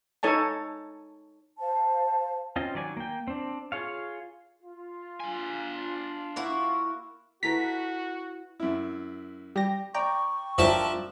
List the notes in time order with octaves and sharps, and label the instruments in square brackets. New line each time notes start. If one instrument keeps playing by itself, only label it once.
[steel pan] D#4 A4 C#5 G#5 A5
[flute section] C5 F5 A5
[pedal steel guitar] C4 C#4 F4 D#5
D#3 F#3 D5 D#5 G#5
A#3 G5
C4 D4
F4 G#4 C#5 F5
[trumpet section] F4
[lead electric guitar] D4 G#5
[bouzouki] A#3 E4 F#4
[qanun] E4 A4 B4 [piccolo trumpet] F#4 [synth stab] A#5 B6
[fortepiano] F#2 E4
[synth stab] G3 A#6 [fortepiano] G4
[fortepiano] D5 [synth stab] G5 A#5 [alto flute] C#6
[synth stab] F#2 [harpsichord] F3 E5 A5 [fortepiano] D4 G4 A#4